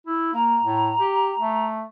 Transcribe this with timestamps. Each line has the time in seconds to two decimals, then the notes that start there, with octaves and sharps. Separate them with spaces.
0.07 E4
0.34 A#3 A#5
0.63 A2
0.99 G4
1.39 A3